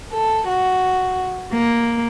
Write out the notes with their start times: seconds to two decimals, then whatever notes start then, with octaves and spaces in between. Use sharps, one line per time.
0.13 A4
0.48 F#4
1.52 A#3